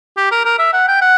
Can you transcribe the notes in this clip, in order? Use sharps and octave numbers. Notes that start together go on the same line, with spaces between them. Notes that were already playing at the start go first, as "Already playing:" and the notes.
G4
A#4
A#4
E5
F#5
G5
F#5